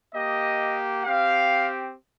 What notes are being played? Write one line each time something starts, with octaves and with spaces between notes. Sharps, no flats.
A#3 G4 D#5
C4 G4 F5